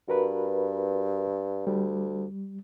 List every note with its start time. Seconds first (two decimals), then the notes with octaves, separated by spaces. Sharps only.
0.08 G2 F#4 A#4 B4
1.67 D2 G3